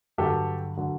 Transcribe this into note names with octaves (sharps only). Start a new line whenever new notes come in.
G2 D3 F#3 G4 A4
D3 F#3